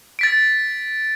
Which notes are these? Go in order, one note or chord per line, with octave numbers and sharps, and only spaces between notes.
A6 B6 D7